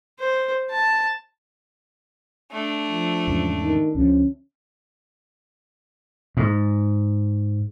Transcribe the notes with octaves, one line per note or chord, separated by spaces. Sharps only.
C5
A5
A3 D4
F3
E2 G#2 C#3
D#3
C#2 D3 F3 C#4
G#2